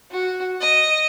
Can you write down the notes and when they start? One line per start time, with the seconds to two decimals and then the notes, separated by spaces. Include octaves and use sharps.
0.11 F#4
0.61 D#5